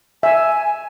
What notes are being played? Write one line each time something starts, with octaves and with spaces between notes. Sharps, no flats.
E5 G#5